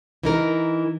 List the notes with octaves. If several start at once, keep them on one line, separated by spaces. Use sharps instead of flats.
E3 D#4 A#4